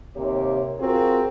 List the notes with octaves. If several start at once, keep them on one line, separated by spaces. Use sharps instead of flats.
D#2 C3 A#3 G4 C#5
C4 F4 F#4 G#4 A#4